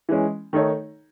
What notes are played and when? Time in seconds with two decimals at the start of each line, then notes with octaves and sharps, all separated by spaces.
0.09 E3 G#3 C#4
0.53 D#3 A3 D#4 A4 C#5